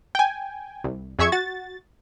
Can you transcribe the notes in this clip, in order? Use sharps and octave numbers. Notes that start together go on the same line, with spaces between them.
G5 G#5
C2
F2 G#4 E5 C#6 G#6
F#4 A6